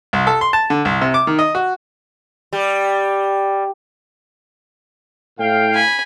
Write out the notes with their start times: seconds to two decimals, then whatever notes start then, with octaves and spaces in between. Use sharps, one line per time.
0.13 C2
0.27 A4
0.41 C6
0.53 A5
0.70 D3
0.85 C2
1.01 C3
1.14 D6
1.27 D#3
1.39 D#5
1.55 F#4
2.53 G3
5.39 A2 F5 G5
5.74 G#5 B5